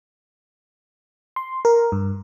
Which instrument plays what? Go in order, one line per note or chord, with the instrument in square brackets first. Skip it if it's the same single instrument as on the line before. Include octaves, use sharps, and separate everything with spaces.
[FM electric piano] C6
A#4
G2